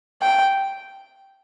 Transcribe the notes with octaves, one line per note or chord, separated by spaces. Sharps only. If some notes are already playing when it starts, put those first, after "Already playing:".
G5